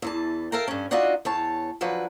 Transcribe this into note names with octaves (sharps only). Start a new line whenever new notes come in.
E2 E3 A5
A4 A#4 E5 F5 G5 A#5
G2 C#4
D4 D#4 F4 F#4 D#5 E5
E2 C#5 A5
D3 F3 F#3 B4